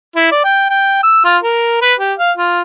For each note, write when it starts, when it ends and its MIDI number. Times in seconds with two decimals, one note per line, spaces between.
0.16 0.31 64
0.32 0.42 74
0.44 0.69 79
0.70 0.99 79
1.03 1.20 88
1.25 1.37 65
1.43 1.81 70
1.82 1.94 71
1.99 2.13 67
2.18 2.31 77
2.37 2.61 65